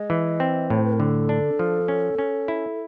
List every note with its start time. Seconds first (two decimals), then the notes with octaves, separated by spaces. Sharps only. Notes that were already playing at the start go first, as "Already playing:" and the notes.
Already playing: G#3 D#5
0.10 E3
0.40 C4
0.70 A2 C#5
0.78 C5
0.85 B4
0.92 A#4
1.00 D3 A4
1.29 D4
1.59 F3
1.88 C#4
2.18 C#4
2.48 E4